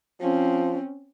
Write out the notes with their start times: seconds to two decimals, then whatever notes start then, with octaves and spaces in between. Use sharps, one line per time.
0.21 F3 C4 C#4